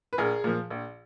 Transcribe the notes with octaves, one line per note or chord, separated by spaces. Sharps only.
B4
A#1 G#4 A#4
A#2 F3
A#1